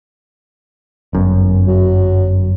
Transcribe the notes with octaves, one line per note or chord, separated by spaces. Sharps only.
G1 F#2
F#3